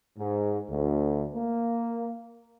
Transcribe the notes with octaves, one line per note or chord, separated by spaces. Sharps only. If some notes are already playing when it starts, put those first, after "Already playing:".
G#2
D2
A#3